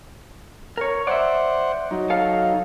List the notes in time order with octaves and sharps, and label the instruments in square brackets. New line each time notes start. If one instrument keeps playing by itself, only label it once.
[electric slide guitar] A#4 C#5
[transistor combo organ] C5 F#5 [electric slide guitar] D5 E5
[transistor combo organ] F#3 D#4
[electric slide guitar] A4 F5